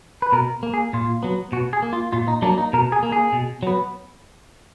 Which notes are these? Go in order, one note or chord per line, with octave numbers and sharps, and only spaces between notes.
B4
B2 A#4
A#3
G#4
A#2 F4
F#3 B3
B2 F#4
G#4
A#3
F4
A#2 F4
D#4
F#3 A#3 D4
D#4
B2 A#4
G#4
A#3
G#4
B2
F#3 B3